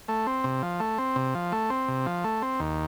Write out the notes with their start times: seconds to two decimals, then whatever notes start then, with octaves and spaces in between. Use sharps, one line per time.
0.08 A3
0.27 C4
0.44 C3
0.63 F3
0.80 A3
0.98 C4
1.16 C3
1.35 F3
1.52 A3
1.70 C4
1.88 C3
2.06 F3
2.24 A3
2.42 C4
2.60 D#2